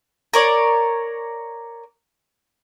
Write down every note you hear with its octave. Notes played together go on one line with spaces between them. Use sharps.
A#4 C#5 D5